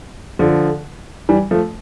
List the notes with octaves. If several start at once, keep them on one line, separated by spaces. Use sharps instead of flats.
D3 F3
E3 G3
F3 A3